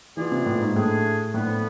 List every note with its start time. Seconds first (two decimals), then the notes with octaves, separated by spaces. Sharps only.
0.17 B2 E3 B3 F4 G#4 D5
0.32 C3
0.46 A2
0.61 G#2
0.76 A2 A3 D4 G#4
1.34 A2 D3 F3 B3